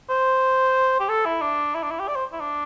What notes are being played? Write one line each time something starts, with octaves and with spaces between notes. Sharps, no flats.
C5
G4
A4
E4
D4
E4
D4
E4
G4
D5
C5
E4
D4